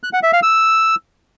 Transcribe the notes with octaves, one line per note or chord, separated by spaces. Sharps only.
F#6
F#5
E5
F5
E6